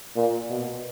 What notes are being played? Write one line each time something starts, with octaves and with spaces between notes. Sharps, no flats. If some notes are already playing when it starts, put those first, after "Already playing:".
A#2
B2